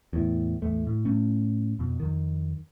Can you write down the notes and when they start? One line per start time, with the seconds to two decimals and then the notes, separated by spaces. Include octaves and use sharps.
0.13 E2 A2
0.62 A1 E2 A3
0.87 A2
1.05 A2 A3 C#4
1.79 F2 B2
2.00 F2 D#3